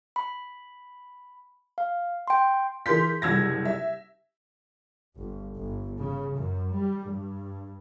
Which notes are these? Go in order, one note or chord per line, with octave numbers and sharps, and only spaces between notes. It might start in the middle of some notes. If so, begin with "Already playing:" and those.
B5
F5
G5 C6
E3 G#4 A#4 C6 G6 B6
F#1 C2 E6 G#6 A#6
E5
G1
G1
C#3
F#2
G3
G2